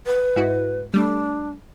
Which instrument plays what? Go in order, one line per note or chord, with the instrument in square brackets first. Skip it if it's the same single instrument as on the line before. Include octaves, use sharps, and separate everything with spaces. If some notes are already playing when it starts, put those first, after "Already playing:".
[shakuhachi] B4
[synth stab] G#2 E4 F#4
[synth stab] G3 A3 [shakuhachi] D4